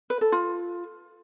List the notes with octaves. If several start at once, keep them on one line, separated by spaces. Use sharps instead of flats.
B4
A4
F4